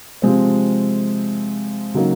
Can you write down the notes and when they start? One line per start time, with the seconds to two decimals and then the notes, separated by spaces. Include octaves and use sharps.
0.22 C3 F3 G#3 C4
1.94 C#3 F#3 A#3 D#4 F#4